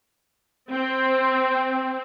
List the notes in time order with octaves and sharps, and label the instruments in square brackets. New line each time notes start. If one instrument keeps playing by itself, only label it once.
[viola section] C4